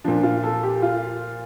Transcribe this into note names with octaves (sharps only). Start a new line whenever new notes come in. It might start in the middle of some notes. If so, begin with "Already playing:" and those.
A#2 F3 D4
F4
A4
G4
F4